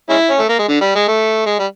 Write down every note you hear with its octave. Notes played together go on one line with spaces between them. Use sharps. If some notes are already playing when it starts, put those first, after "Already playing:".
G#3 C#4 E4
C#4
A3
A#3
G#3
D3
G3
G#3
A3
G#3
G3